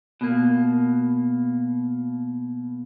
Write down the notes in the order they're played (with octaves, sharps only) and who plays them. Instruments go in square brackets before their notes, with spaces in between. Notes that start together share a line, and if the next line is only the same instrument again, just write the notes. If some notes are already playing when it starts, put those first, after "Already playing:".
[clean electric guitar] B2 A#3